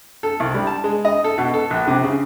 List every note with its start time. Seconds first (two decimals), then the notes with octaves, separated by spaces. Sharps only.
0.23 A4
0.40 C2
0.54 G3
0.67 A5
0.84 G#3
1.05 D#5
1.24 A4
1.38 B2
1.54 A4
1.70 A#1
1.87 C3
2.03 C#3